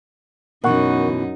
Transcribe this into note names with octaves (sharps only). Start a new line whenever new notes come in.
F#2 B2 E3 D#4 A#4 F#5 C#6